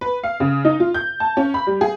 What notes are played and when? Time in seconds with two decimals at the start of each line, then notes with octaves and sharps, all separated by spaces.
0.01 B4
0.23 F5
0.40 C#3
0.65 D#4
0.80 F4
0.94 G6
1.20 A5
1.37 C#4
1.54 B5
1.67 G3
1.81 G#4